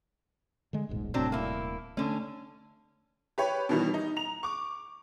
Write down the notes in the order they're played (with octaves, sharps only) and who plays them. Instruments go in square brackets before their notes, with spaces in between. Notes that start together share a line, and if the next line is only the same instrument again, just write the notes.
[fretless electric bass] D3 G#3
D#1 B1 G#2
[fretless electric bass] D#1 A2 C3 [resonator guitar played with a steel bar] F#3 C4 D4
[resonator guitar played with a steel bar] A#3 E4
[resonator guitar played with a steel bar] D3 C#4 [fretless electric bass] A3
[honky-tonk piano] G4 B4 C#5
B2 D#3 E3 G3
D#4
A#5 F7
C#6 D6